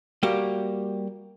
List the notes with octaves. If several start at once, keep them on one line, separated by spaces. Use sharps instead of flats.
G3 A#3 F#4 G4